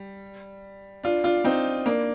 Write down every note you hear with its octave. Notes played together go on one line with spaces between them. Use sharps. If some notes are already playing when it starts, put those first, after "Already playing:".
Already playing: G3
D4 F4
D4 F4
C4 D#4
A#3 D4